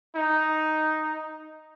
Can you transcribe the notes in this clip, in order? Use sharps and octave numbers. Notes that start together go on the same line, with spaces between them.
D#4